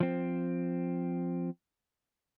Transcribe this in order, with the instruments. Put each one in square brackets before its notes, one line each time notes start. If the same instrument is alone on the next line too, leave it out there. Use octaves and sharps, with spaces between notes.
[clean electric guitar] F3 C4